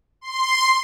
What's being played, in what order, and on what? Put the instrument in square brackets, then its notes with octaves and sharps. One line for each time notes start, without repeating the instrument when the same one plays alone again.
[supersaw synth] C6